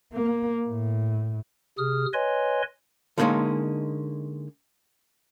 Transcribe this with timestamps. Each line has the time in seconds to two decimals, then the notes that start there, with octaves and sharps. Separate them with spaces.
0.13 A#3
0.68 A2
1.78 C3 G#4 D#6 F6
2.13 B4 C#5 D#5 G#5 C6
3.18 D3 G3 G#3 A#3 C#4 D#4